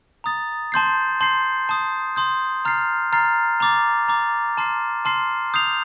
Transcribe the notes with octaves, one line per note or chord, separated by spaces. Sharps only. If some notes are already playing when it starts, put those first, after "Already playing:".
A#5 D#6 A6
A5 C6 G6 C7
A5 C6 G6 C7
A5 C6 D#6 G6
A5 C6 D#6 G6
A#5 F6 A6 C7
A#5 F6 A6 C7
A#5 D6 A6
A#5 D6 A6
A5 C6 F6 C7
A5 C6 F6 C7
D#6 G6 C7 F7